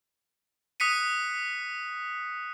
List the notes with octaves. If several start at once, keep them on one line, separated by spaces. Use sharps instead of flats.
D#6 F#6 B6 C#7 D#7